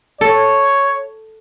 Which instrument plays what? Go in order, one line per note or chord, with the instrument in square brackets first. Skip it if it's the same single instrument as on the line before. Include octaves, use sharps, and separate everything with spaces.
[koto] A4 [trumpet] C#5